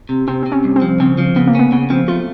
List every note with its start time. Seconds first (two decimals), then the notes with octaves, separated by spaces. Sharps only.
0.09 C3
0.28 C3 C4
0.43 C3 C4
0.52 C#4
0.64 C2
0.76 C4
0.82 F3
1.00 C#3 C4
1.18 F3
1.36 C#3 B3
1.48 A#3
1.55 B3 C#4
1.72 C#3 B3
1.90 F3 C4
2.08 A3 F4